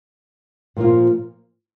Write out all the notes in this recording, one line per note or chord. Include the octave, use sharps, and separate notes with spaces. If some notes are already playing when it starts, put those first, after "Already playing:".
A#2 F3 A#3 F4